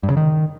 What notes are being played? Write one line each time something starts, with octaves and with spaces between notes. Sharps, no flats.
G2
C#3
D#3